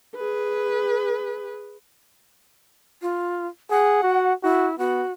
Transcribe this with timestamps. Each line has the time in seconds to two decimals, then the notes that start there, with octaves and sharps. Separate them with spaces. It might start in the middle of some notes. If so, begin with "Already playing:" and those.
0.16 G#4 B4
3.02 F4
3.70 G#4 F#5
4.03 F#4
4.43 E4 F#4
4.79 B3 F#4